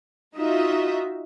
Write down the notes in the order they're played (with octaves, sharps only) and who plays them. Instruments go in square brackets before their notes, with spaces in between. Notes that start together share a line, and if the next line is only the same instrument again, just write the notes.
[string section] D#4 F4 F#4 D#5 E5